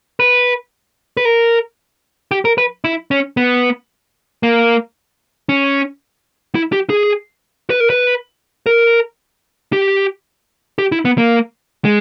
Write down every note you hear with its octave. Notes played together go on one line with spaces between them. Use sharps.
B4
B4
A#4
G4
A#4
B4
E4
C#4
B3
A#3
C#4
E4
G4
G#4
B4
A#4
B4
A#4
G4
G4
E4
B3
A#3
G#3